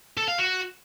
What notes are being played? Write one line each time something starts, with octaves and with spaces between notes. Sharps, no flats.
A4
F5
F#4